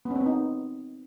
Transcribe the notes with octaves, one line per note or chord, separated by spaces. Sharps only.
B3
C#4
C4
B3
D#4